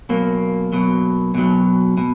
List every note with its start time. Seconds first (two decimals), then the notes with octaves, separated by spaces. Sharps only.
0.09 B2 F#3 A#3
0.72 B2 F#3
1.35 B2 F#3
1.98 B2